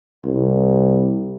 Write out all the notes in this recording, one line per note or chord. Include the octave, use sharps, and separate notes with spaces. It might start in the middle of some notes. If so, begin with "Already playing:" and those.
C2